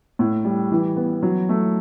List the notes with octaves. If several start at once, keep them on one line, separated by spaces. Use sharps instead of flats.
A2
G3
E3
B3
F#3
A3